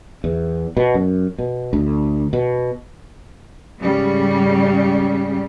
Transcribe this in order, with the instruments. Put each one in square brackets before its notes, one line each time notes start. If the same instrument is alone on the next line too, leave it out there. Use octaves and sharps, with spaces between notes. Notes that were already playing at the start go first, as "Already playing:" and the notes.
[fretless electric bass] E2
B2
F#2
B2
D2
B2
[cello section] G#2 C#3 G3